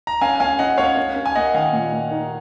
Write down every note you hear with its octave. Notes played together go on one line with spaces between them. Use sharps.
A#5
C#4 F5 G#5
C#4 F5 G#5
C#4 D#5 F#5
C#4 C#5 F5
C#4
C#4
G#5
A#3 D#5 F#5
D#3 F5 G#5
A#2
A#2
D#4